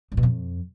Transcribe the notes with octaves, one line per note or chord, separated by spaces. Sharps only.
G2
B2
F2